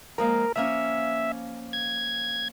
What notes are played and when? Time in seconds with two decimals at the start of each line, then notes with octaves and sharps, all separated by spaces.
0.18 F3 G#3 A#3 A#4
0.56 F3 A#3 C#4 E5
1.73 G#6